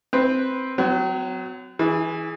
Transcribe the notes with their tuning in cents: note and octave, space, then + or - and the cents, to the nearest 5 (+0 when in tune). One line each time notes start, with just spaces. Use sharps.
C4 +0 B4 +0
F#3 +0 C4 -45
E3 -15 G#4 +0